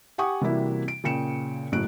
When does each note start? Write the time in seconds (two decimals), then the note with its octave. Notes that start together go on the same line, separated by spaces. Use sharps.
0.18 G4 F#5 G#5 C#6 D#6
0.41 C3 E3 G3 A#3 E4 F#4
0.88 D7
1.04 A#2 C#3 G5 C#7 E7
1.72 F#1 A2 F#3 F#6 D7